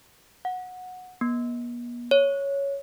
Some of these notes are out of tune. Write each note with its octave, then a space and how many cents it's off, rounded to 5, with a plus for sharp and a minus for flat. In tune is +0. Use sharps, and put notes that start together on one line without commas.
F#5 -15
B3 -45
C#5 +5